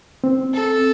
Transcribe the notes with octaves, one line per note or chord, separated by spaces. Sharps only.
C4
A4